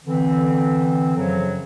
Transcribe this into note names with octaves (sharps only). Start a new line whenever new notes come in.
D3 E3 C4
F#2 C#3 F3 F#3